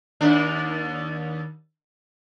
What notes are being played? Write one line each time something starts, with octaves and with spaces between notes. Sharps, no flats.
D#2 D4